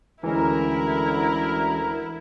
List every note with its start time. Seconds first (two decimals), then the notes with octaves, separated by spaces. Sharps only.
0.24 D2 E3 G#3 C#4 E4 A#4